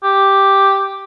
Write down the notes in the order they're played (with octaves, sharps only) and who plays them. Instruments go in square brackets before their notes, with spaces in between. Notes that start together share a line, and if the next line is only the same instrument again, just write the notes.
[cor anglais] G4